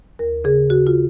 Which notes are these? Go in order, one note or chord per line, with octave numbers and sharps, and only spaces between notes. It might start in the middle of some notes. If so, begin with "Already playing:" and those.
D#2 A#4
C#3 G#4
C#3 F#4
F4